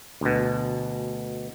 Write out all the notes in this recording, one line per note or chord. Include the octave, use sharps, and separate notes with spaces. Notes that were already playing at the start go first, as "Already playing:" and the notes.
D2 B2